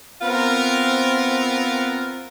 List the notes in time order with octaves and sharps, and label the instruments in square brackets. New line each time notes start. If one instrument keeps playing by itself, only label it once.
[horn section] B3 C4 F4 A#4